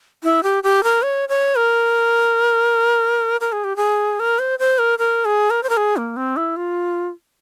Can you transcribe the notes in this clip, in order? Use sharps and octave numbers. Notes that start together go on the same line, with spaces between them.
E4
G4
G4
A#4
C#5
C#5
A#4
A#4
G#4
G4
G#4
A#4
C5
C5
A#4
A#4
G#4
A#4
C5
A#4
G#4
A#3
C4
E4
F4